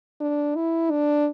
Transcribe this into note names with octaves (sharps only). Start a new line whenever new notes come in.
D4
E4
D4